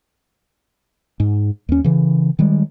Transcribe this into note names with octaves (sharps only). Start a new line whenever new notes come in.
G#2
D#2 C#4
C#3 E3
D#3 G3 G#3